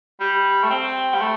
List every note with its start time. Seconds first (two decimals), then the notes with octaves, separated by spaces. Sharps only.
0.20 G3
0.63 A3
0.70 C4
1.14 G3
1.21 A3